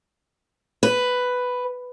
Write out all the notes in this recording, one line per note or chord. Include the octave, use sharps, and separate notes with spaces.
B4